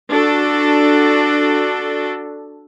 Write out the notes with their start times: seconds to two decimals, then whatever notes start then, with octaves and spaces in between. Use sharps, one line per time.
0.11 D4 F#4 A4